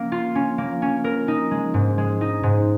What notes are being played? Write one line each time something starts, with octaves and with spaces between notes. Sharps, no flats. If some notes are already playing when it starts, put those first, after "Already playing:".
Already playing: A#3 C#4
F4
C#4
A#3
C#4
A#4
D#4
G#3
G#2
G#3
D#4
G#2